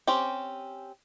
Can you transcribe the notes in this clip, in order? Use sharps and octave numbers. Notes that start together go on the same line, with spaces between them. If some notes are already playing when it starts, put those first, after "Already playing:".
C4 C#4 G4